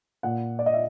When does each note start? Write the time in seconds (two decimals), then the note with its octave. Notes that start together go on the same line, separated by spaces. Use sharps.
0.23 A#2 F#5
0.59 D5
0.66 D#5
0.74 E5